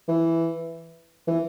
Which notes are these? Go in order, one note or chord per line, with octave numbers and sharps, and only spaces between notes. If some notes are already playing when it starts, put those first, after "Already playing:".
E3
E3